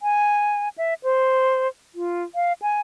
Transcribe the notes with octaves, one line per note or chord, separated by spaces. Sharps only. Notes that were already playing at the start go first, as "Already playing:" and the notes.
G#5
E5
C5
F4
F5
G#5